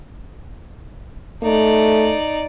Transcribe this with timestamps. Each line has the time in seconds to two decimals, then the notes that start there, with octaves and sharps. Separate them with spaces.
1.43 A3 D#4 D5